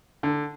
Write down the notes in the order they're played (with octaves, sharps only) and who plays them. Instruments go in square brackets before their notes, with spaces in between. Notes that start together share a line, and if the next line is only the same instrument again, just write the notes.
[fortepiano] D3